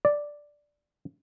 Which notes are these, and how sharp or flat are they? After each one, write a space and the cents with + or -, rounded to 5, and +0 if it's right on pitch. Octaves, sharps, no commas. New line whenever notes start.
D5 +0